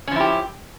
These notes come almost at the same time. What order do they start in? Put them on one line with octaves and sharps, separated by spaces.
C#4 F3 E4 G4